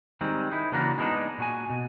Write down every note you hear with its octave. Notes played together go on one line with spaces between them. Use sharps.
D#3 G3 G#3 C4
D#4 E4
C#3 E3 A#3 D4 F#4 A#4
G#3 A#3 B3 D4 D#4
A#2 F#4 G#5
B2